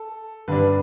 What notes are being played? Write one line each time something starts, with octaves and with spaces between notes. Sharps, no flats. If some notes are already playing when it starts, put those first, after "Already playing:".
Already playing: A4
G2 D3 G3 D4 B4